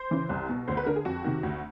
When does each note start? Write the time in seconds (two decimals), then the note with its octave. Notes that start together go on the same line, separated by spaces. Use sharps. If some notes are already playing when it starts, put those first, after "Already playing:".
Already playing: C5
0.11 C#3 E3
0.29 C2
0.49 B2
0.68 D2 C5
0.77 B4
0.86 D3 A#4
0.96 G#4
1.05 F2 F#4
1.24 C3 D#3
1.43 D2